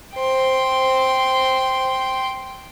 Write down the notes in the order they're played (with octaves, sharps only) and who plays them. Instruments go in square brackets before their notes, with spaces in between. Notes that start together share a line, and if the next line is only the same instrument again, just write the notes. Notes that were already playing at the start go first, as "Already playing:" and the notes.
[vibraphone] C5 [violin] G5 C6